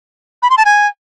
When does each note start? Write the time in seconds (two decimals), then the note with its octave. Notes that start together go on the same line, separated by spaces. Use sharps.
0.43 B5
0.50 C6
0.58 A5
0.65 G#5